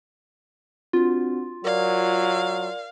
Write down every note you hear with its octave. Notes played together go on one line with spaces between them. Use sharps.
C4 D4 F4 F#4
F#3 A#4 D5 F5